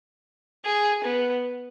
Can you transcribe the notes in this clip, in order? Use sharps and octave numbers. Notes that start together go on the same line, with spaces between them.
G#4
B3